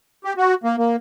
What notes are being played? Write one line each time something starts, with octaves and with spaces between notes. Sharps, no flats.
G4
F#4
A#3
A#3